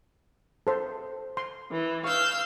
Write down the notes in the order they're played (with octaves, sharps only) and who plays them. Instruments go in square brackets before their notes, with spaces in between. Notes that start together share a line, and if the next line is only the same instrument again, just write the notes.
[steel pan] A4 C5
C6
[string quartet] E3
[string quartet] F5 E6 G6 [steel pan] C#6